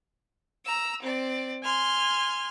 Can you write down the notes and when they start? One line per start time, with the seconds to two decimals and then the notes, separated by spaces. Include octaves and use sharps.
0.65 A#5 E6
1.02 C4 D5
1.63 G#5 C6 F6